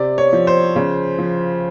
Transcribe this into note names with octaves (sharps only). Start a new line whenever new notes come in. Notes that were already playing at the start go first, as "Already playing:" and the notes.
Already playing: C3 D5
C#5
F3
C5
C#3
F3